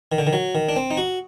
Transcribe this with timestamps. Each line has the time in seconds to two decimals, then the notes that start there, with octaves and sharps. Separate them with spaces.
0.12 D#3
0.18 D3
0.27 D#3
0.33 F#3
0.55 D#3
0.69 D4
0.76 C4
0.91 D#4
0.97 F#4